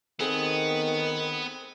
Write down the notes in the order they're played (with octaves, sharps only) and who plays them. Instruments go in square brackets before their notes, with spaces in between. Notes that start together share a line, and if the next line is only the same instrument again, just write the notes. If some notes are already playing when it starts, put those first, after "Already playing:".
[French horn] D#3 [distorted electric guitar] B3 [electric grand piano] C4 G#4 A4